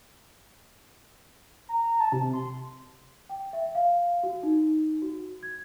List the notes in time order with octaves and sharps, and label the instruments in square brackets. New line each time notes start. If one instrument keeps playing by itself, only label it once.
[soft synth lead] A#5
A5
C3
C6
[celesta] G5
E5
F5
F#4
D#4
F#4
G#6